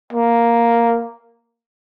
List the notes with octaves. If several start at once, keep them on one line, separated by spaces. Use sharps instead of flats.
A#3